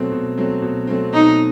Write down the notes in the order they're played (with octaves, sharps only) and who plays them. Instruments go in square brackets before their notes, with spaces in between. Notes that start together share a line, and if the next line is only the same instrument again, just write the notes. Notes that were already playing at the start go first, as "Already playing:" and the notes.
Already playing: [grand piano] B2 F#3 A3 C4
B2
F#3 A3 C4
B2
F#3 A3 C4
[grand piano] B2 [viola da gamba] D#4